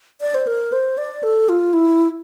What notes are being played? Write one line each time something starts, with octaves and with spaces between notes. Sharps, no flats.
D5
C5
A#4
C5
D5
A4
F4
E4